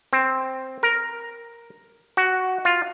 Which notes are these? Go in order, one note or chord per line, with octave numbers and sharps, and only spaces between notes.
C4
A#4
F#4
F4